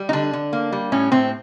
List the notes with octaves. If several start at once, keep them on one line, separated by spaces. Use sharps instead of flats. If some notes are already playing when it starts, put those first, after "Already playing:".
Already playing: G3
D#4
D3 D4
D3
A#3
G3
A2 C#4
A2 C4